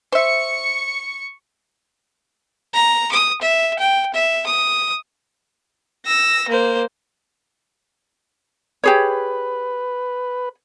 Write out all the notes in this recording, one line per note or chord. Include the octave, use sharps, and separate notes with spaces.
C5 E5 C#6 C#7
A#5
D#6
E5
G5
E5
D#6
E6 A#6
A#3 C5
G4 G#4 B4 C#5